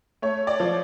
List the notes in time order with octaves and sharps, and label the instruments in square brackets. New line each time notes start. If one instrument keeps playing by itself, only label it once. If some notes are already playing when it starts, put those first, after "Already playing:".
[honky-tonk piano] A3 C#5
D5
F3